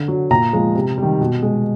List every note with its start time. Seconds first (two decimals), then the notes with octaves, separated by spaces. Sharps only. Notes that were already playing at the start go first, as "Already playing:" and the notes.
Already playing: D3
0.08 F#3
0.30 A#2 A#5
0.53 F3 G#3
0.75 C3
0.98 D#3 G3
1.21 B2
1.43 G#3